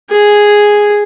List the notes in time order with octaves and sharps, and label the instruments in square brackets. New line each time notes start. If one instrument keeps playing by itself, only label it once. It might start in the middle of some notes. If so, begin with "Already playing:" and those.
[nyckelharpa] G#4